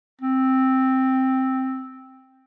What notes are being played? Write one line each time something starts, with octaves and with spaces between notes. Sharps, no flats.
C4